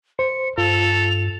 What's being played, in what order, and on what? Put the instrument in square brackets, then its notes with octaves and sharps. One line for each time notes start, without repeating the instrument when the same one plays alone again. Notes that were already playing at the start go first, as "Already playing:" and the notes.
[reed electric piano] C5 [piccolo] C#7
[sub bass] G2 [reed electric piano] F4 [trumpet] A4 [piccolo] F7